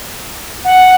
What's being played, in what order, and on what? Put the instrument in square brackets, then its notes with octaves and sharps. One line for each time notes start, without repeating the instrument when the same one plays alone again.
[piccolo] F#5